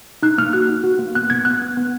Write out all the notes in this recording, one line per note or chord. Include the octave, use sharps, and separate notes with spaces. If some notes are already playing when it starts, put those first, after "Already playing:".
D#4 F#6
A#3 F6
F#4 F#6
D#4
F#4
A#3
B3 F#6
B3 G#6
B3 F#6
B3
B3